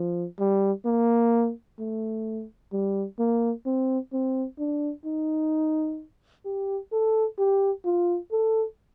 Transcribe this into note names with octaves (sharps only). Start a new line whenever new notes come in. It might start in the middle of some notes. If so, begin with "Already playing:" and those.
Already playing: F3
G3
A#3
A3
G3
A#3
C4
C4
D4
D#4
G4
A4
G4
F4
A4